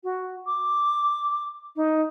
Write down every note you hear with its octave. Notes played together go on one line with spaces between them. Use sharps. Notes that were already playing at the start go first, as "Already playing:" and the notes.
F#4
D6
D#4